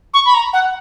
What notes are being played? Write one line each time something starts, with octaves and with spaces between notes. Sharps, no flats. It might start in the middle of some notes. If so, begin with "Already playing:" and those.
C#6
B5
A#5
F#5